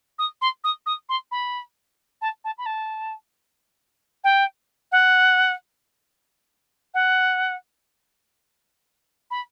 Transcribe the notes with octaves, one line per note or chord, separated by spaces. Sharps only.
D#6
C6
D#6
D#6
C6
B5
A5
A5
B5
A5
G5
F#5
F#5
B5